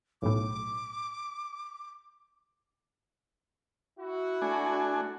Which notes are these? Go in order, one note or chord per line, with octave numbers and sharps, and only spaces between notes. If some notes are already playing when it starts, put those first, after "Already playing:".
B1 A2 D6
E4 F#4
A3 D4 G#5